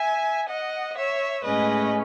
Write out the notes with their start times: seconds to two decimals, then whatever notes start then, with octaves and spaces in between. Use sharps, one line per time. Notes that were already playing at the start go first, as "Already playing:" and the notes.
Already playing: E5 G#5
0.48 D#5 F#5
0.96 C#5 E5
1.43 A2 G#3 C#4 B4 D#5